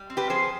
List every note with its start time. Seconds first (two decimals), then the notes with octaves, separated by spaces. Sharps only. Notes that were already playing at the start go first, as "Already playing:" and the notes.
Already playing: G3
0.10 C4
0.17 G4 B4
0.30 F3 G#4 C5